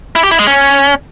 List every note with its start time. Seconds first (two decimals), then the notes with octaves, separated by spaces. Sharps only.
0.16 E4
0.23 G4
0.31 E4
0.39 G#3
0.47 C#4